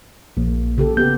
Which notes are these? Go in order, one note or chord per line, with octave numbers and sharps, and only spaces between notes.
A#1 A#3
C#3 G4 A4
B3 G4 G6